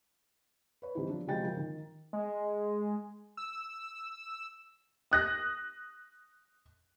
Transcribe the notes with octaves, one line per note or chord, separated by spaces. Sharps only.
B4 C#5
E3 G3 C4 D#4 E4
F3 D4
C3 F3 F#3 G#3 G5 A6
F3 A#4 G5
D#3
G#3
E6
D#6 F#6 A#6